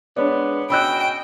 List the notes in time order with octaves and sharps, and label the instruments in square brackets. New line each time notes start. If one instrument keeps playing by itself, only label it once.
[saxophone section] G#3 B3 [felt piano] D4 C#5 D5
[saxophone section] C#4 F#4 D#5 [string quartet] G5 [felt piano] B5 E6 F#6